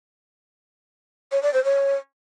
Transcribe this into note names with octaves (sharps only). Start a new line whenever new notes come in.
C#5
D5
C5
C#5